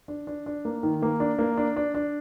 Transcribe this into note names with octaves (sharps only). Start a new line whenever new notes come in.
D4
D4
D4
A#3
D#3
A#3
D4
A#3
D4
D4
D4